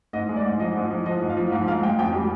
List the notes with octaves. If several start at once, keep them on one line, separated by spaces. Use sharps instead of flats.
G#2 D#5
G#3
D5
G#2
F3 D#5
G#2
F3
F3 D#5
G#2
F5
F3
G#2 F5
G#3 F5
G#3 G5
F2 G5
G3